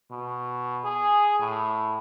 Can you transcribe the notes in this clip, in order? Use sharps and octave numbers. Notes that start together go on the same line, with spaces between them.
B2
G#4
A2